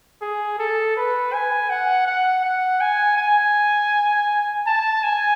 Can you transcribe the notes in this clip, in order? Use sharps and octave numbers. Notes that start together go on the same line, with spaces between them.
G#4
A4
B4
G#5
F#5
F#5
F#5
G#5
G#5
A5
G#5